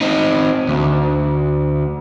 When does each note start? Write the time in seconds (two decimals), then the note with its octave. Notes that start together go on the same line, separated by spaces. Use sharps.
0.01 C4 D#4
0.68 D2